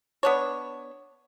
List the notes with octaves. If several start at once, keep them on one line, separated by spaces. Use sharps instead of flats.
B3 D4 C#5